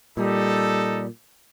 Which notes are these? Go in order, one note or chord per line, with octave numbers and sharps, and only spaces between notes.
A#2 G3 D#4 A4